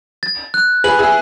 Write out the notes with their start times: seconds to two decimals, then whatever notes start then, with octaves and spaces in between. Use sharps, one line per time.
0.23 A6
0.54 F#6
0.84 G#4 B4 F#7
0.99 E4 G#4